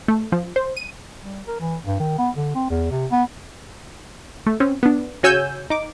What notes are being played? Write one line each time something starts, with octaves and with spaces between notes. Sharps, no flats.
A3
F3
C5
D#7
G3
A#4
E3
G2
D#3
B3
D3
C4
E2
C3
B3
A3
C4 C#4
B3 D4
C#3 F#4 C#5 G#5 E6 G6
D#4 D6